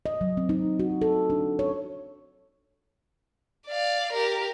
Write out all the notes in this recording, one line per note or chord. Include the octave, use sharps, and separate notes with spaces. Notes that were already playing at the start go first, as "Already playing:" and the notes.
D#5
F#3
C4
D#4
F#4
A4
D4
C#5
D5 F5
G4 A#4